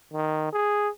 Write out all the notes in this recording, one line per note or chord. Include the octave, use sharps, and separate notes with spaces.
D#3
G#4